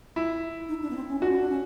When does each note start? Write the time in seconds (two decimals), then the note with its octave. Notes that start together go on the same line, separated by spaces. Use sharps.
0.16 E4
0.69 D#4
0.82 D4
0.90 B3
0.96 C4
1.08 C#4
1.19 D4 F#4
1.29 C#4
1.39 D4
1.49 C#4